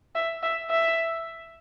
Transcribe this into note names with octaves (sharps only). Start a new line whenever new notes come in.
E5
E5
E5